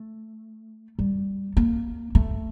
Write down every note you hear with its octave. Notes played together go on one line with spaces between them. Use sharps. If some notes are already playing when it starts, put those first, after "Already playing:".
Already playing: A3
G3
A#3
A3